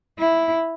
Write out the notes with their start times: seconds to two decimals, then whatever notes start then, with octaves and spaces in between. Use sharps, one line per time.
0.18 E4